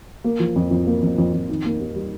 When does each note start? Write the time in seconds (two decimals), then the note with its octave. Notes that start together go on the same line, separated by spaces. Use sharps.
0.24 A#3
0.40 F3
0.56 F2
0.71 F2
0.87 A#3
1.02 F2
1.18 F2
1.34 F2
1.49 D#3
1.65 A#3
1.80 D#2
1.96 G3